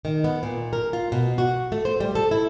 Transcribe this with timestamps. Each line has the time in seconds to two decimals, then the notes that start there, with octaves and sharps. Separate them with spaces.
0.05 D#3
0.24 B3
0.43 A#2
0.73 A#4
0.93 F4
1.12 B2
1.38 F#4
1.72 A3
1.85 C5
2.00 G3
2.15 A4
2.31 E4